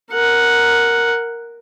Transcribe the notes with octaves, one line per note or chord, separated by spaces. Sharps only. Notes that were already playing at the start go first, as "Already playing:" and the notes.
A#4 F#5